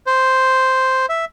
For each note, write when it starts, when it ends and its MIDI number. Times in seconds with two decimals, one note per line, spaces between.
0.07 1.06 72
1.09 1.25 76